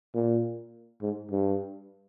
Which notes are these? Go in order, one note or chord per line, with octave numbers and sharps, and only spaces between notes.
A#2
G#2
G2